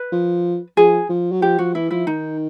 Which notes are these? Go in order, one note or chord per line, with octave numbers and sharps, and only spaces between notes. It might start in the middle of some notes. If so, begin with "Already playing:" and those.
Already playing: B4
F3
F3 G#4
F3
F#3
F3 G4
F3 F#4
E3 E4
F3 E4
D#3 D#4